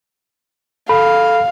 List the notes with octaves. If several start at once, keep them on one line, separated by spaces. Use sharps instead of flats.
A4 F5 B5